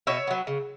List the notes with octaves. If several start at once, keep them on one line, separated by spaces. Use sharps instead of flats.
B2 C#5 E5
F#3 B3
C#3